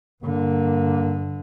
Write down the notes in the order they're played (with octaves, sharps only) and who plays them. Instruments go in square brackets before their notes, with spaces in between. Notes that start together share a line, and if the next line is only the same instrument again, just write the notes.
[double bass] G2 D3 [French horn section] A#3